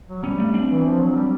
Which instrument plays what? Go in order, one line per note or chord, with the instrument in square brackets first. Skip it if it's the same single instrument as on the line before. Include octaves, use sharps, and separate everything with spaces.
[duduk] F#3
[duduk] G3 [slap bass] B3 C#4
[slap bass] A3 B3
C4 D4
[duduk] E3
F3
F#3
F#3
G3